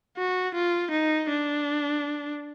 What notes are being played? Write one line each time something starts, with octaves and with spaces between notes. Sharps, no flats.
F#4
F4
D#4
D4